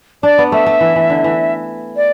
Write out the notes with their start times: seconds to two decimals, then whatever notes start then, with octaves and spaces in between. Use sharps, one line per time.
0.23 D4 D5
0.38 B3
0.52 A3 E5
0.66 A3
0.81 E3
0.96 E3
1.10 D3
1.24 E3
1.96 D5